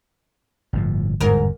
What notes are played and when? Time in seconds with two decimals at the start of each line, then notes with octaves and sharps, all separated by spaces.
0.73 G1 A2 F3
1.20 G1 E2 G#2 A#4